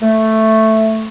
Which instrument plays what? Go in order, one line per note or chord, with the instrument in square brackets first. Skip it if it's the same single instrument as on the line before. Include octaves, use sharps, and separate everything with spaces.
[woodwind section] A3